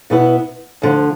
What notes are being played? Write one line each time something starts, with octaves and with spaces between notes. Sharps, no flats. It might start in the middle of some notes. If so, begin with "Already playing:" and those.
B2 B3 E4 B4
D2 D3 F3